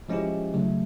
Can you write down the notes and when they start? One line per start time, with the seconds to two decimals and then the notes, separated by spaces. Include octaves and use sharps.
0.09 F3 G#3 C#4 E4 G4
0.54 C#3 F#3 A3